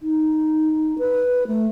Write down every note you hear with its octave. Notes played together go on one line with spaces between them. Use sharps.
D#4
B4
A3